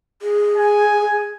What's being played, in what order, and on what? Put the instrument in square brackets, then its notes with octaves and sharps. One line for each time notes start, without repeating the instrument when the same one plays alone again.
[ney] G#4
[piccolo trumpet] G#5